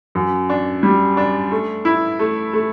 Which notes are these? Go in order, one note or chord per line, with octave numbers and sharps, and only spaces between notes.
F#2
D4
G3
D4
A3
E4
A3
A3